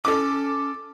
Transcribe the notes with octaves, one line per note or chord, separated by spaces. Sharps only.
C#4 A4 D6